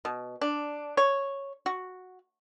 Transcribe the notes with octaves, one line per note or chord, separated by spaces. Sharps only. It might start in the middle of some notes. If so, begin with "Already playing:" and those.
B2
D4
C#5
F#4